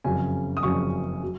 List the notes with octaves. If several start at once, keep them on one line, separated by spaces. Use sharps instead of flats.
F#1 F2 C#3 F#3 C#4 G#5
D#6
F#1 F2 C#3 F#3 C#4 C#6
F#3